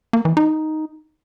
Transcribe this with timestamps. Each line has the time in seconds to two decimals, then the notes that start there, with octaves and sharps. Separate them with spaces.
0.13 A#3
0.25 E3
0.37 D#4